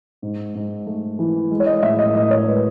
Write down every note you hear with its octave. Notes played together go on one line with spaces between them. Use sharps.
G#2
G#2
A3
E3
G#3
C#5
D#5
A2 E5
D#5
A2 D#5
C#5
G#3 B4